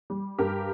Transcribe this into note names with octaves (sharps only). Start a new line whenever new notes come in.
G3
G2 G4 A#4